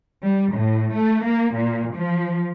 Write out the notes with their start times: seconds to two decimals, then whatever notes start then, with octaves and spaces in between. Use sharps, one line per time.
0.24 G3
0.54 A2
0.94 A3
1.26 A#3
1.55 A#2
1.95 F3